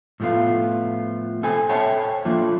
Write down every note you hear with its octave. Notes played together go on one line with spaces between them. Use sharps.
A2 F3 A3 B3 F4
C4 A4 C5 G#5
A4 C5 C#5 E5 G5 A5
F3 A3 A#3 D4 F4